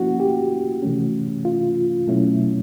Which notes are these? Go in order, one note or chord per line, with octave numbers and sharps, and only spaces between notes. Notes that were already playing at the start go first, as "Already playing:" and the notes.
Already playing: F3 A#3 C#4 E4 F#4
G4
C3 E3 A3 C#4
F4
B2 F#3 A3 C#4 E4